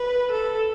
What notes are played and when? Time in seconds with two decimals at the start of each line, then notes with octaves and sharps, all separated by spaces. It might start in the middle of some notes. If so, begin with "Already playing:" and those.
Already playing: B4
0.31 A4